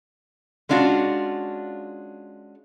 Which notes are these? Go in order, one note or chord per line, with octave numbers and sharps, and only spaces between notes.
G#3 C#4 D4 F4 F#4